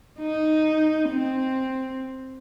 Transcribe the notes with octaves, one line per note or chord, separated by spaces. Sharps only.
D#4
C4